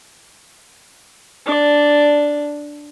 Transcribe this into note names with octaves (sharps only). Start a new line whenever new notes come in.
D4 D5